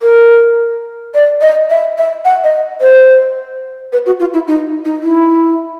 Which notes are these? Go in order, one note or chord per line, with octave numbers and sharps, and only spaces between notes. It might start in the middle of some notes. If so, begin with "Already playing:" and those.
A#4
D5
D#5
E5
E5
F#5
D#5
C5
B4
F#4
F4
E4
D#4
D#4
E4